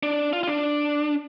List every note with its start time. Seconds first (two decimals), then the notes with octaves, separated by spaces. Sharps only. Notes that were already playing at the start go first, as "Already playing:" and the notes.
0.03 D4
0.33 F4
0.43 F4
0.47 D4